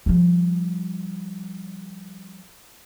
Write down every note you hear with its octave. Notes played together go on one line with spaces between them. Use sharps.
F3 G3